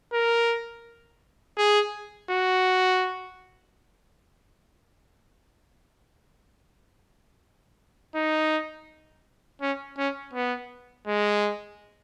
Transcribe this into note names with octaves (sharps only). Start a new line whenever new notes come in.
A#4
G#4
F#4
D#4
C#4
C#4
B3
G#3